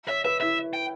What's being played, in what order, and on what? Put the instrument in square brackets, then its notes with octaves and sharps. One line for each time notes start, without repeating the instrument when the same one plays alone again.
[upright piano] C#5 [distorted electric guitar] E5
[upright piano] B4 [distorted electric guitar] E5
[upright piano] E4 [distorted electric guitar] E5
[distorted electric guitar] G5